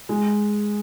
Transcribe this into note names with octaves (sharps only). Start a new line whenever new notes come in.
G#3